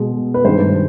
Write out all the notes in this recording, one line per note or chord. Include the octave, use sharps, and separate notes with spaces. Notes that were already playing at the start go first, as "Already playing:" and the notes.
Already playing: B2 G#3
B4
G2 D#3 G#3 C5